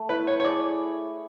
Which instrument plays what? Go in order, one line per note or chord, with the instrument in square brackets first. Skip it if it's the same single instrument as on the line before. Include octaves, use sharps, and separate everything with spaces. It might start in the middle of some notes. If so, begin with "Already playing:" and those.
Already playing: [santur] A3
[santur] E4 [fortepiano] B4
[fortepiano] C#5
C#5
[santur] G#4 [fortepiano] D5